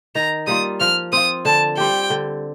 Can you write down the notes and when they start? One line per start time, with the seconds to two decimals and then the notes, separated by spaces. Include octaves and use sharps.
0.15 D#3 A#5
0.47 G3 A#3 F4 D#6
0.80 F3 F6
1.13 C4 F4 D#6
1.45 D3 A5
1.78 G3 C4 G4 G5
2.10 D3